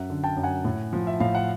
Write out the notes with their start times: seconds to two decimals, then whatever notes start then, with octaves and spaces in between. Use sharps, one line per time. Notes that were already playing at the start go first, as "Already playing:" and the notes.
Already playing: F#2 E5 F#5
0.10 D3
0.24 G5 A5
0.37 F#2
0.43 F#5 G#5
0.65 A2
0.93 F3
1.07 E5
1.20 A2 F5
1.35 F#5